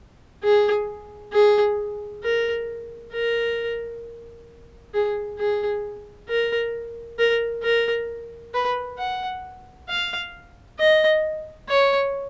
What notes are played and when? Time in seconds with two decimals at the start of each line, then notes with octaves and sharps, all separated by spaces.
0.44 G#4
1.33 G#4
2.24 A#4
3.13 A#4
4.94 G#4
5.39 G#4
6.28 A#4
7.19 A#4
7.63 A#4
8.54 B4
8.98 F#5
9.89 F5
10.79 D#5
11.69 C#5